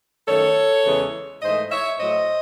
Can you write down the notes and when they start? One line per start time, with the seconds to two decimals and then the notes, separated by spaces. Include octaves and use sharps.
0.28 F#2 D#3 A3 A4 C#5
0.85 E2 C#3 E3 G#3
1.42 G#2 E3 A3 C5 D#5
1.71 C#5 E5
2.00 A2 F#3 A3 C5 D#5